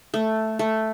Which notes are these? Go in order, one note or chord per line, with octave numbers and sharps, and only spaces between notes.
A3
A3